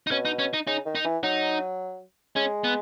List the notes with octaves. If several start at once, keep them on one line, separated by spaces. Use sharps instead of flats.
D#4
B2 C#4
D#4
C#4
D#4
C#3 D#4
D#3
D#4
E3
F#3 D#4
G#3 C#4
B3